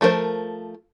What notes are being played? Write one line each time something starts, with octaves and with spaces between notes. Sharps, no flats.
F3 A3 F#4 A#4 C5